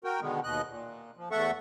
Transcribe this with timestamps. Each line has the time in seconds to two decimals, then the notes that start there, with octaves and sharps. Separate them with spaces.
0.04 F#4 A#4 G5
0.21 B2 D3 D#3 G#3 B3
0.44 D#2 B2 D#5 F#6
0.68 A#2
1.17 F3
1.31 E2 A3 A4 E5 F#5 C#6